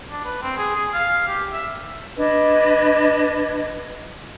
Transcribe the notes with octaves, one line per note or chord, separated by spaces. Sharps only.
D4
B4
C4
G#4
G#4
F5
G4
E5
D4 B4 D#5 G#6